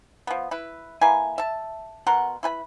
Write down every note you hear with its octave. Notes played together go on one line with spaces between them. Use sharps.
F3 B3
E4 B4
A#3 E4 B4 G#5
E5 A5
B2 A#4 F#5 C6
E4 B4 G#5 B5